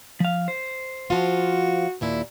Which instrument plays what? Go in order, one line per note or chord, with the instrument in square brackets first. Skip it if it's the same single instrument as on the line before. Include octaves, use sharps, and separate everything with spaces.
[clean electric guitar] F3 F5
C5
[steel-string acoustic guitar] F3 F4 [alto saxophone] F#4
[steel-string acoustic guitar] D#2 A#2 E4